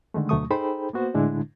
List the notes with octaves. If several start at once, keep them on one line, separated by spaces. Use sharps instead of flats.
D3 D#3 G#3 A3
D2 B2 F#3 A3 C#6 D#6
D#4 G#4 A4 C5 G5 B5
A#3 B3 F#4 C5
A2 D3 G#3 D4 E4